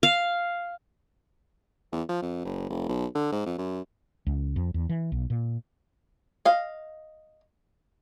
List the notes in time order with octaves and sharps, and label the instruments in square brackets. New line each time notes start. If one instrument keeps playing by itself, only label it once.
[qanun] F5
[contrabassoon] E2
F3
F2
F#1
F1
B1
D3
G#2
F2
F#2
[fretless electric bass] C#2
F2
E2
E3
B1
A#2
[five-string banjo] D#5 F5